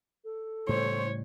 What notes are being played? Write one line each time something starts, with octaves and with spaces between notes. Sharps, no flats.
A4
A2 C#3 G3 C5 C#5